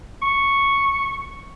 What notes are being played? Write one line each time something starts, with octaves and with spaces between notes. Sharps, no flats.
C#6